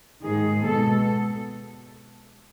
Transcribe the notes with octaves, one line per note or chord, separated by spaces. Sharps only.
G#2 D#3 G#3 G#4
B2 G#3 B3 A4